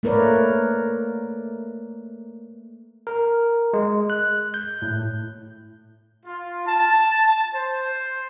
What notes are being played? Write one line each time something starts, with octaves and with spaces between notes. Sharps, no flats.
A3 A#3 A#4 B4 C#5 D5
A#4
G#3
F#6
G6
A2
F4
A5
C5